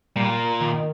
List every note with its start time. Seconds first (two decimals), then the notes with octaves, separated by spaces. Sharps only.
0.16 A#2 G3
0.61 D#3